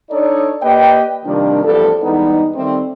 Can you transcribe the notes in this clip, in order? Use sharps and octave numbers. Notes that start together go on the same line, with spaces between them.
D4 D#4 A4 C#5 D5
A#3 G4 B4 D5 D#5 G5
C3 D#3 F3 G3 A#3 D4
A1 E2 G2 F3 G3 A4
E2 G2 G3 G#3 B3 D#4
D#3 G3 A3 C4